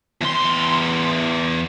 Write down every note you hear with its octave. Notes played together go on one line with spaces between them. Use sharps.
E2 C6